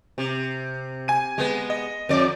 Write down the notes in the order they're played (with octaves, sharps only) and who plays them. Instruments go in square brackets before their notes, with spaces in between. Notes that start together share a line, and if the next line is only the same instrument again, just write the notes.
[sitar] C3
[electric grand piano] G#5 D#7
[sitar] G#3 B3
[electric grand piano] D#5
[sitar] F2 D5